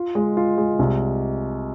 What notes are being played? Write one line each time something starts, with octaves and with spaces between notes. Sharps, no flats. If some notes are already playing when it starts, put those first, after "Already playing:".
Already playing: F4
G#3
F4
G#3
C2